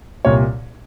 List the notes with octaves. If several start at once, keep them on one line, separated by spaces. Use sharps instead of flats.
C2 A#2 G3 C#5